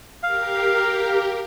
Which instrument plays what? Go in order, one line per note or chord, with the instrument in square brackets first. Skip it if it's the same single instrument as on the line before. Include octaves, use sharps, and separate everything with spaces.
[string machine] G4 A#4 [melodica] F5